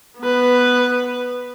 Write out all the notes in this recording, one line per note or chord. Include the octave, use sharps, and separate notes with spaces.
B3 B4